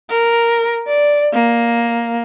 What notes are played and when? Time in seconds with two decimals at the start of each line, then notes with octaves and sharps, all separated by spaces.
0.10 A#4
0.87 D5
1.33 A#3